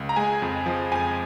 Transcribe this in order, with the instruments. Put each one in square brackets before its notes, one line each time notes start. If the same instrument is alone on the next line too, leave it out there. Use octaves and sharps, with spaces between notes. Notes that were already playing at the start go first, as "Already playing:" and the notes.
Already playing: [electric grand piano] C#2
A#5
G#3 G#5
F2
F3
F2 G#5